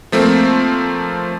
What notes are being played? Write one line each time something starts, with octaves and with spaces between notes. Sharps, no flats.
F3 A3 A#3 C4